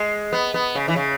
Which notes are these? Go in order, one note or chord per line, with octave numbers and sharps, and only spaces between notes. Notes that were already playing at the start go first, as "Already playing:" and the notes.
Already playing: G#3
B3
B3
C#3
E3
C#3